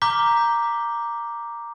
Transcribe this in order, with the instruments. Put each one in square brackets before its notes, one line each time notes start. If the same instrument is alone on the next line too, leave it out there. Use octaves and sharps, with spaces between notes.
[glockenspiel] A#5 D6 F6 G6 B6 G7